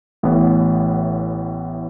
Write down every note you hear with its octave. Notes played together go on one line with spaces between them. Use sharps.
A1 A2 E3 B3